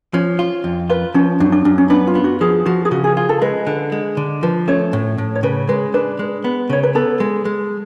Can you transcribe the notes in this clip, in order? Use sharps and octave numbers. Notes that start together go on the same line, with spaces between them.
F3 C#4 C#5
F4
F2
F4 B4
F3 C#4
F#2 D4
D4
F#2 D4
C#4
B3 D4
F4
B3
F#4
F3 G#4
F3 F#4
G#4
C#3 F#4
G#4
F4 G#4
A4
G#3 B4
D3
G#3
D3
F3 B4
A3 C#4 C#5
A2
A2
C#5
C#3 B4
G#3 B4
D4 B4
G#3
B3
C#3 C#5
B4
B3 A4
G#3
G#3